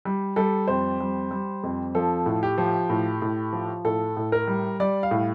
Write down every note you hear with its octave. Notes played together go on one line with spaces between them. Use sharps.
G3
G3 A4
F2 C5
G3
G3
F2
F3 A4
A2
G4
F3
A2
A2
F3
A2 A4
A2
A#4
G3
G3 D5
F5
A2